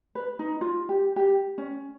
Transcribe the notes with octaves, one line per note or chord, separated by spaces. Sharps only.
B4
D#4
F4
G4
G4
C#4